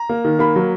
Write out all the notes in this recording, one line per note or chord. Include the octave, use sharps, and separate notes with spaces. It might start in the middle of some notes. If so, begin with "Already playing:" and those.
Already playing: A#5
A#3
D#3
A#3 B5
F#3